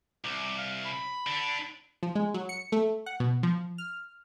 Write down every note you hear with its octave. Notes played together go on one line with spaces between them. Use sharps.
C2 D6
F5
B5
D3 D4
F3
G#3
F#3
C#7
A3
F#5
B2
F3
F6